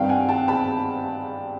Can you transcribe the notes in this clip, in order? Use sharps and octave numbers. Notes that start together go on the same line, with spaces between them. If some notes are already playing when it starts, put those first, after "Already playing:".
Already playing: G2 D#3 G3 C4 F5 G5
F#5 G#5
G5 A5
A5 B5